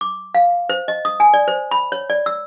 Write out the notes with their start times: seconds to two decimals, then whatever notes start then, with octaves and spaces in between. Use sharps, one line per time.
0.01 D6
0.35 F5
0.69 C5
0.88 D#5
1.05 D#6
1.20 G#5
1.34 D5
1.48 C5
1.71 B5
1.92 C#5
2.10 D5
2.26 E6